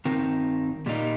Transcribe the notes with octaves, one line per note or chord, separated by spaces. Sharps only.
G2 D#3 C4 D#4 A#4
A#2 G3 A#3 D#4